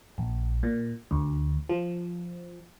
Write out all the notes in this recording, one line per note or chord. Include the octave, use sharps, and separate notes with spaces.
A#1
A#2
D2
F3